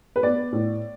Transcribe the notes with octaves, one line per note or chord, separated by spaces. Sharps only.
B4
B3 D5
A2